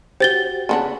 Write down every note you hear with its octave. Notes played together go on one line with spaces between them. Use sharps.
F#4 G4 C5 A6 G7
C#3 B3 D4